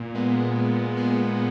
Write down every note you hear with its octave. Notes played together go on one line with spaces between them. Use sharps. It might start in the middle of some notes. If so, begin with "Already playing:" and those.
Already playing: A#2
G#3 B3
A#2
G#3 B3